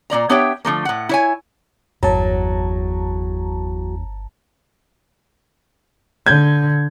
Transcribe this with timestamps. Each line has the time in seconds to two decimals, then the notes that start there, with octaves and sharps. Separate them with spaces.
0.10 A#2 A#3 D5 A#5
0.29 B3 D4 G4 C#5 E5 G5
0.65 D3 F3 A3 A#3
0.85 A2 F#5
1.09 E4 C#5 G#5
2.03 G1 E2 F#3 A5 A#5
6.26 D3 G6 G#6